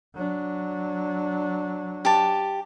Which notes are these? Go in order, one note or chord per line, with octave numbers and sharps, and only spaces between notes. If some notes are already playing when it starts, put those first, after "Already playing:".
F#3 D4
G4 A5